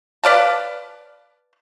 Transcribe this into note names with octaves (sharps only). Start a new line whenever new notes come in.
B4 D5 F5 A5